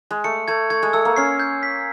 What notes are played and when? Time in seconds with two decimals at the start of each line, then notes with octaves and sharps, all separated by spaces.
0.11 G#3
0.24 A3 C#7
0.48 A3 G#6
0.70 A3 G#6
0.83 G#3
0.93 A3 E6
1.05 A#3
1.16 C#4 C7
1.39 G6
1.63 B6